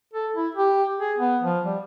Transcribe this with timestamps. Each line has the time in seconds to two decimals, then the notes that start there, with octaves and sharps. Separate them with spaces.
0.13 A4
0.36 E4
0.55 G4
1.00 G#4
1.18 B3
1.43 F3
1.65 G3